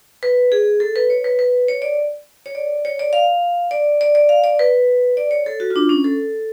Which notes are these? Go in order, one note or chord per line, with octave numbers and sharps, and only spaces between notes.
B4
G#4
A4
B4
C#5
B4
B4
C#5
D5
C#5
D5
C#5
D5
F5
D5
D5
D5
F5
D5
B4
D5
C#5
A4
F#4
F4
D4
C#4
A4